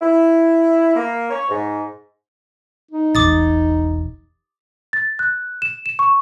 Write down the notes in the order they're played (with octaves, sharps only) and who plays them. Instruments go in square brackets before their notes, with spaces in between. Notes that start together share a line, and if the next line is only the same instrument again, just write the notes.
[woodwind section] E4
A#3
C#5
G#2
[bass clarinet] D#4
[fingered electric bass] E1 A1 [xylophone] D6 D#6 A6
[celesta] A6
F#6
E7
E7
C#6